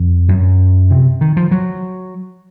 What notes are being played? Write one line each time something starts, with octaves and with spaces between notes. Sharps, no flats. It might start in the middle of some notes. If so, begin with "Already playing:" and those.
Already playing: F2
F#2
C3
D#3
F3
F#3